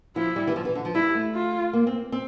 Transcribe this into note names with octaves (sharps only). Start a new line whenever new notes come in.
F3 E4
G3
E3
F3
E3
D3
F3
G3 E4
A3
F4
A#3
C4
C4